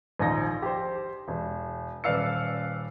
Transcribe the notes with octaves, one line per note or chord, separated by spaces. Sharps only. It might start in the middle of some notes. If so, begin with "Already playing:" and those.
A#1 D#2 D#4 A#6
G4 C5
E1
D#1 B4 D5 F5 E6 C#7